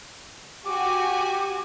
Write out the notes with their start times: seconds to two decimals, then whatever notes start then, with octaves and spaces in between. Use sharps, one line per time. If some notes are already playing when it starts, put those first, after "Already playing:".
0.65 F#4 G4 G#5 D6